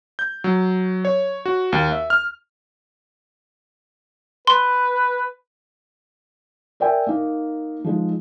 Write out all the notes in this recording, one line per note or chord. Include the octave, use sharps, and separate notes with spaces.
G6
F#3
C#5
F#4
D#2
E5
F6
B4 C6
A#4 D5 E5 G5 G#5
A#3 D#4
F3 G#3 D#4